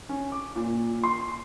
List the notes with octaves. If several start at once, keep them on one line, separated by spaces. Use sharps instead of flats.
C#4
D6
A#2
C6